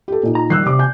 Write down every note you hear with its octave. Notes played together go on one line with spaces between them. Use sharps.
G4 A4
A#2 D#4
A#5
D#3 G3 E6 F#6 C7
C3 G4 D5 D6
G#5 G6